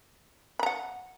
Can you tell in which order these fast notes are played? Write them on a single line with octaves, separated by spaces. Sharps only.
B5 A#5 F#5